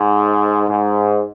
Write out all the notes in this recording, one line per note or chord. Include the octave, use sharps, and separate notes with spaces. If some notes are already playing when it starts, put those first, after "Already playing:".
Already playing: G#2
G#2